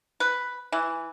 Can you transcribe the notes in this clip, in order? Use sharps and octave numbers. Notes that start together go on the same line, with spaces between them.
B4
E3